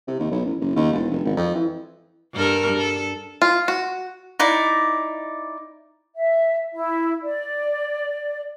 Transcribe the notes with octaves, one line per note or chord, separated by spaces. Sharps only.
C3
D#2
B1
A1
F#1
D#2
E1
F1
G#1
F2
E3
G2 A4 A#4
A4
F4
F#4
D#4 E4 D5
E5
E4
D5